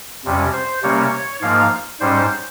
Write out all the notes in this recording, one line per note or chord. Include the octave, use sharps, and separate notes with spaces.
F2 C3 G3 C#4
C5
C3 G3 A#3 C#4 C#5
G#2 F3 A#3 F5
G#2 G3 C#4 C5